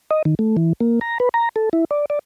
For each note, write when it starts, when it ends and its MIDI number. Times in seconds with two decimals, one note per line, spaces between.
0.11 0.22 75
0.25 0.35 51
0.39 0.56 57
0.57 0.73 52
0.80 0.99 58
1.01 1.18 82
1.20 1.29 71
1.34 1.49 82
1.56 1.69 69
1.73 1.85 64
1.91 2.05 74
2.10 2.19 74